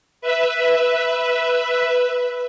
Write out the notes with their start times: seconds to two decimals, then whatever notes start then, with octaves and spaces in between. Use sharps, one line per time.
0.21 B4 E5